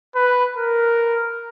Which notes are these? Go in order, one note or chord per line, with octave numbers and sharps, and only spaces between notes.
B4
A#4